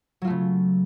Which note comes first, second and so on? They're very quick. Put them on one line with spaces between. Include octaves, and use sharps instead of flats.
F#3 F4 A3 C#3